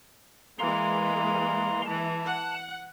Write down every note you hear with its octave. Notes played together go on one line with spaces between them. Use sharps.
E3 G#3 A#3 F5 A#5 C6
E3 A5
F#5